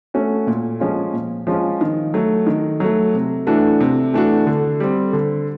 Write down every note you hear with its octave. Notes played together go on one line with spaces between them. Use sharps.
A3 C#4 F#4
A#2
F3 G#3 C#4 F4
A#2
F3 G#3 C#4 F4
D#3
F#3 A3
D#3
F#3 A3
C3
E3 A3 D4 F#4
C3
E3 A3 D4 F#4
D3
G3 C4
D3